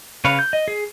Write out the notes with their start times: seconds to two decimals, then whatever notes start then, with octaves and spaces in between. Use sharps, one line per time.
0.25 C#3 B4 C#5 F5
0.39 G6
0.53 D#5
0.68 G#4